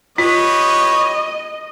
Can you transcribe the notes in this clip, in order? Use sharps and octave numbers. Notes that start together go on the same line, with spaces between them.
F4 G4 B4 C#5 D#5